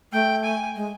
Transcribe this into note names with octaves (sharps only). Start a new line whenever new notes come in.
A3 G5
G#5
G#3